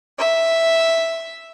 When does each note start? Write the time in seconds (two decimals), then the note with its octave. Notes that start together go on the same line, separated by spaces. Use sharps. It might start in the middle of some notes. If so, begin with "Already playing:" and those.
0.20 E5